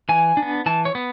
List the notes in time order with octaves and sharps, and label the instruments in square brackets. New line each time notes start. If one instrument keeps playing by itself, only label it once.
[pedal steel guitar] E3 G#5
D4
B3
E3 A5
C#5
B3